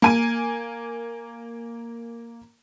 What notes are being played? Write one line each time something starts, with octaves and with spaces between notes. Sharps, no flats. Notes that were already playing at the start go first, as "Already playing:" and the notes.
A#3 G#5 D#7